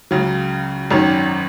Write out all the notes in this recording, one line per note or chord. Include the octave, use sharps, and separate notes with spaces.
C#2 C#3 F#3
G#1 F#2 D#3 F#3 C#4